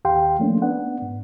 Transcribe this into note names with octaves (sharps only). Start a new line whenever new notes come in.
D#2 G4 F5 G5 C6
F3 A3 A#3 C#4 D4
B3 D4 F#5
G#2